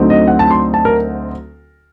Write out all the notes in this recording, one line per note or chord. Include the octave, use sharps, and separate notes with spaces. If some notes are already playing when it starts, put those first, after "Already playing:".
Already playing: D2 D3 F#3 C4 D#4
D#5
F#5
A5
C6
A5
A#4